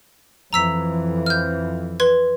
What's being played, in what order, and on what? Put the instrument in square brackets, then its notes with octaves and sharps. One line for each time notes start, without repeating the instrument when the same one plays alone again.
[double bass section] F2 E3 [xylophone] A#5 E6 B6
[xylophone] F6 G6
B4 C6 G#6